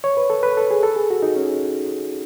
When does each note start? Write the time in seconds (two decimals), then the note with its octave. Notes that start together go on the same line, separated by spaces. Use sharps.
0.04 C#5
0.17 B4
0.30 A4
0.43 B4
0.57 A4
0.71 G#4
0.83 A4
0.96 G#4
1.10 F#4
1.23 D#4
1.36 C#4